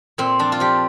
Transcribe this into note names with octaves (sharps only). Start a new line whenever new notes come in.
A#2 C4
F3 D4
F4
F3 G4